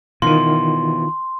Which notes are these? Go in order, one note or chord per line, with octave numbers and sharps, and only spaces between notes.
B2 D#3 E3 F4 C6